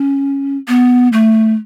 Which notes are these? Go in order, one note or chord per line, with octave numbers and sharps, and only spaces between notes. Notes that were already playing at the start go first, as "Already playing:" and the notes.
Already playing: C#4
B3
A3